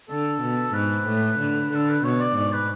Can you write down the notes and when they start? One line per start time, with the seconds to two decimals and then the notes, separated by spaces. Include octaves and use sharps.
0.09 D3 A4
0.42 B2
0.74 G#2 B4
1.07 A2
1.39 D3
1.72 D3 A4
1.90 B4
2.04 B2 C#5
2.20 D5
2.36 G#2 D5
2.53 B4